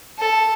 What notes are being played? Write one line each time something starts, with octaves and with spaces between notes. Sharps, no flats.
A4